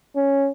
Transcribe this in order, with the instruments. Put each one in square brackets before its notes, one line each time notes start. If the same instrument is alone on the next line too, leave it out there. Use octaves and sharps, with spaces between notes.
[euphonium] C#4